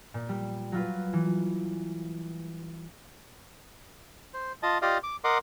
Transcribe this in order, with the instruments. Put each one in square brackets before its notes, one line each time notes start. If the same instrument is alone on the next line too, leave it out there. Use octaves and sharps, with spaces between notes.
[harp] A#2
G3
F#3 F4 B4
E3
[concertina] C5
F4 D#5 A5
F4 G4 D5 D#5 F5
D6
A#4 D#5 F#5 C6 D6